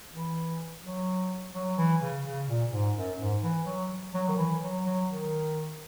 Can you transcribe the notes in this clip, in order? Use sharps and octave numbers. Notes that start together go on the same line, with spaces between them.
E3
F#3
F#3
E3
C#3
C#3
A#2
G#2
F#2
G#2
E3
F#3
F#3
D#3
E3
F#3
F#3
D#3